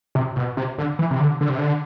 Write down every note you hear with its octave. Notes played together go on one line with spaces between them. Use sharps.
C3
B2
C3
D3
E3
C3
D3
D3
C3
D3